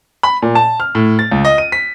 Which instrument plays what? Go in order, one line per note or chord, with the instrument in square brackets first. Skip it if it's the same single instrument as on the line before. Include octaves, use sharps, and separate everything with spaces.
[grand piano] B5
A#2
A5
F6
A2
A6
C#2
D#5
D#7
B6